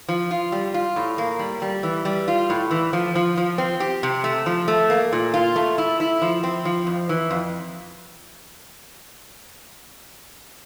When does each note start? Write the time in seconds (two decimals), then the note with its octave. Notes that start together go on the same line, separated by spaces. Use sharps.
0.09 F3
0.31 F4
0.52 G3
0.74 F4
0.96 A2
1.18 A#3
1.39 G3
1.62 G3
1.83 E3
2.05 G3
2.28 F4
2.50 A2
2.71 E3
2.93 F3
3.15 F3
3.37 F3
3.58 C4
3.80 G4
4.03 C3
4.24 A3
4.46 F3
4.68 A3
4.90 A#3
5.13 A#2
5.34 F4
5.56 A3
5.78 E4
6.00 E4
6.22 F3
6.43 C4
6.65 F3
6.87 F2
7.09 E3
7.30 F2